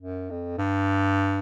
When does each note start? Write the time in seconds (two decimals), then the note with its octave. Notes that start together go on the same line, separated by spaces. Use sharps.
0.02 F#2
0.30 F2
0.58 G2